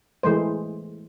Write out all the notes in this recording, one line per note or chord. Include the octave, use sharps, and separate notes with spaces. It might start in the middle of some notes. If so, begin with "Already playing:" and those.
E3 G#3 A3 C5